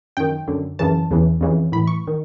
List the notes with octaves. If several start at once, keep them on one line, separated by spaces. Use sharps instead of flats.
F#2 D#3 G5
F#2 D3
F#2 C#3 E3 A5
E2 C#3 E3
F2 C#3 E3
A2 E3 B5
C#6
D#3